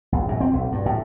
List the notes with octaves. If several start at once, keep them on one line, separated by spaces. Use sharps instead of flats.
A#1
F#2
C4
B1
G2
A2